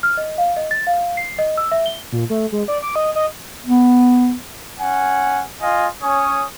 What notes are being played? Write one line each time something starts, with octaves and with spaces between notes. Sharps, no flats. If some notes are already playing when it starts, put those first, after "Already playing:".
F6
D#5
F5
D#5
A6
F5
C7
D#5
E6
E5
G7
A#2
A3
G#3
D5
D6
D#5
D#5
B3
C#4 F#5 G#5
F4 D#5 F5 G#5
C#4 C#5 G#5 D#6